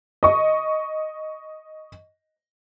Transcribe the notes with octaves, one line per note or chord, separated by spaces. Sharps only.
D#5 C#6